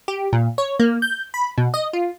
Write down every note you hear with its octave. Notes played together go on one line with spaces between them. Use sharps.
G4
A#2
C#5
A#3
G6
B5
B2
D#5
F4